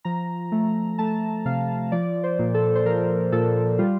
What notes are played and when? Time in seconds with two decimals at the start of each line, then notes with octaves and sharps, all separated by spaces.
0.05 F3 A#5
0.52 A3
0.98 A3 A5
1.45 C3 F5
1.92 F3 D5
2.23 C5
2.39 A#2
2.54 A4
2.75 C5
2.85 F3 A#4
3.32 A#2 A4
3.79 G3 F4